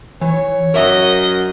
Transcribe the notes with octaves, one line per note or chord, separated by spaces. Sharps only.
E3 C#5
F#2 A#4 D#5 E5